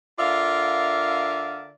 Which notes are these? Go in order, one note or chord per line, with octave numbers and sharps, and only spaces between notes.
D3 F4 A#4 D5 E5 F5